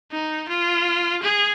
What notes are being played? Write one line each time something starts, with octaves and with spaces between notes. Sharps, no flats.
D#4
F4
G#4